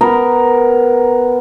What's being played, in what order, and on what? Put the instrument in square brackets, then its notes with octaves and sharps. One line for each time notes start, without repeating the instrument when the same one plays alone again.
[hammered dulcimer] B3 A#4